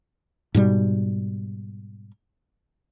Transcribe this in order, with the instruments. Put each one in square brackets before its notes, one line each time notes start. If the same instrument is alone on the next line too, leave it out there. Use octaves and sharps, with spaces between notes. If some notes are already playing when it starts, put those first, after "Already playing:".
[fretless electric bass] G#2 B2 G3